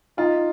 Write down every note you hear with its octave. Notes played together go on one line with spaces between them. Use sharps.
D#4 F4